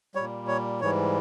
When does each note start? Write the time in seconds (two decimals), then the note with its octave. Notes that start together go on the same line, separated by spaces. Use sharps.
0.15 A#2 G3 C#5
0.48 C#5
0.81 G#2 E3 G3 C#5